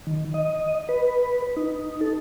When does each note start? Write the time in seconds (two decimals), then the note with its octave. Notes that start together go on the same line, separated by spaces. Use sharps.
0.07 D#3
0.34 D#5
0.89 B4
1.56 D#4
2.01 A4